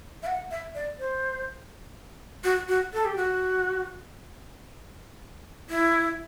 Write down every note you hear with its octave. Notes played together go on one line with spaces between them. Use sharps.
E5
F#5
E5
D5
C5
F#4
F#4
A4
G4
F#4
E4